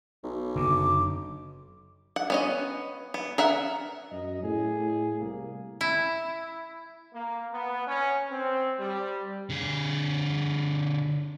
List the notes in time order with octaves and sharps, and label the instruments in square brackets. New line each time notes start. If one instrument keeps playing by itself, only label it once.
[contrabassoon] B1
[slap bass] F#1 F#2 D3 [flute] D6
[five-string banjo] F#5
B3 C#4 D#5
B3
A#4 E5 F#5
[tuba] F#2 [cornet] D#5
[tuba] A2 [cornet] G#4
[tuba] A2
[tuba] C2 [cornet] A#3
[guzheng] E4
[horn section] A#3
B3
C#4
C4
G3
[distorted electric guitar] D3 G#4